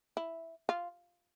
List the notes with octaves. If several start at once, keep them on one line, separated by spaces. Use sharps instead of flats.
E4
F4